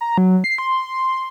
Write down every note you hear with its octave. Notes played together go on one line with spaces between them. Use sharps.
A#5
F#3
C7
C6